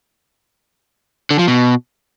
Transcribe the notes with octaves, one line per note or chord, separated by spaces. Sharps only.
D3
F3
B2